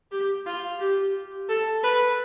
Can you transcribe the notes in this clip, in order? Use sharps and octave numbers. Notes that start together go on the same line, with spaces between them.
G4
F4
G4
A4
B4